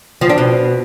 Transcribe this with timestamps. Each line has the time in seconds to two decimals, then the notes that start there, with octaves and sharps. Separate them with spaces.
0.21 F3
0.30 D4
0.38 B2